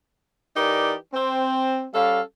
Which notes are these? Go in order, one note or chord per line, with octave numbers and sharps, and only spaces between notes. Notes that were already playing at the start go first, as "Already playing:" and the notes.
E3 D#4 G4 A#4 D5
C4
G3 C#4 A4 F5